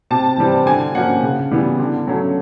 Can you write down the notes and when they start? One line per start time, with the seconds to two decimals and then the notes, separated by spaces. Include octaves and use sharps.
0.11 C3 A5
0.38 E3 G3 C4
0.66 D3 G#5
0.95 F3 A#3 C#4 F#5
1.23 C#3
1.51 E3 G3 B3
1.79 D3
2.07 F#3 A3 C#4